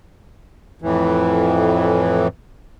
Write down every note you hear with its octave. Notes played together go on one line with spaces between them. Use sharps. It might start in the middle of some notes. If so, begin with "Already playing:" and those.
F2 A2 E3